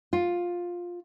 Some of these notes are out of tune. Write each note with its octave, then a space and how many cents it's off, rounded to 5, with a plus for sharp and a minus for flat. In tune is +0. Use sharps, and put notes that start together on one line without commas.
F4 +10